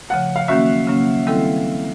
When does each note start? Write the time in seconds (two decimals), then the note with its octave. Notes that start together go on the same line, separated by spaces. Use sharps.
0.09 C#3 F3 A3 F#5
0.36 F5
0.48 D#3 F#3 A#3 C#4 F#4 E5
0.88 C#3 F#3 A#3 C#4
1.27 D#3 G3 C4 E4 A4